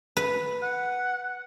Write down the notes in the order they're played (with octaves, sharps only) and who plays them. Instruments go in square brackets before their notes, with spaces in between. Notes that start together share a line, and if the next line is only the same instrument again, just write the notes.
[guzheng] B4
[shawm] F#5